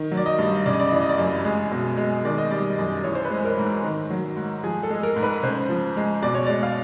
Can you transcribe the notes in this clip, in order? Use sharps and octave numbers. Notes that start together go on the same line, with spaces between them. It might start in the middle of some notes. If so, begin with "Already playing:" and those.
Already playing: D#3
F#3
D5
D#5
G2
C#3 D5
D#5
D5
D#5
E3 D5
D#5
D5
F#2
G#3
B2
G#3
D#3 D5
D#5
G3 D5
F#2
E3 C#5
C5
B4
G#3
A#4
G#2
D#3
F#3
G#2
F3 G#4
A4
G#3
A#4
G#2
B4
C#3 C5
F3
G#3
B2 D5
C#5
G#3 D5
F5